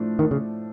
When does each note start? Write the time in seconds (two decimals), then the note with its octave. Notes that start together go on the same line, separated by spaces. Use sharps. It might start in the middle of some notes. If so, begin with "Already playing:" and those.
Already playing: A2 F3 A3 D4
0.19 D#3
0.31 C#3